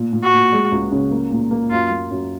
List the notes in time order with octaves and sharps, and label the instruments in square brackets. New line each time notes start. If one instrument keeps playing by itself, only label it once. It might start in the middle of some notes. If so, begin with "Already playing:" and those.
Already playing: [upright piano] A#2
A#2
[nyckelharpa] F#4
[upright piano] A#2
G#3
C#2
C#3
A#3
A#2
A#3
[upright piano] F#2 [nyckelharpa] F4
[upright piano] A#3
F#2